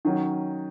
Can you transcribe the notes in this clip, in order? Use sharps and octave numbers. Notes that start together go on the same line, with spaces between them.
D#3 F#3 C#4